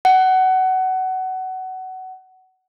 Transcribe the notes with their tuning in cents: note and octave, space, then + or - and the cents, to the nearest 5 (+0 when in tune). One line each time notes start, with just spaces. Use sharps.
F#5 +20